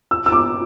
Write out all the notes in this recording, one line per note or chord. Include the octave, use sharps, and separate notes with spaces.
E6
E6
D6